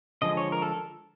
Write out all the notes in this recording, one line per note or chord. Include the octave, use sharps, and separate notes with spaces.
D3 F3 G#3 D#5
C#5
A#4
A4